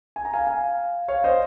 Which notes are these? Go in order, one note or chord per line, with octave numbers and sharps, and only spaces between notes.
G#5
A#5
F5 G#5
F5 G#5
C#5 F5
C5 D#5